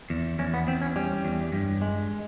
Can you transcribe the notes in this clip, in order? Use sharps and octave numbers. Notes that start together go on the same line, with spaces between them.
E2
E2 C#4
B3
E2 C4
C#4
G3 C#4
E2
G2
G#3